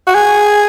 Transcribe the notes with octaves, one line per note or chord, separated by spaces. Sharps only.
F#4
G#4